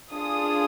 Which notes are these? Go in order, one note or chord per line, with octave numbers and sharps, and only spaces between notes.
D4 F4 G#4 D#6